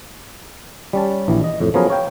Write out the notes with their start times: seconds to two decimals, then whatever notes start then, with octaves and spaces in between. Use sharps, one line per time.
0.93 G3 C#4 A5
1.28 A#1 E3
1.44 D#5
1.60 F2 A2
1.74 F3 F#3 B3 C#4 G#4 A#4
1.90 C#5 F5 G5